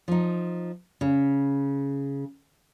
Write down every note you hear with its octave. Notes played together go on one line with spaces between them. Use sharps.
F3 D#4
C#3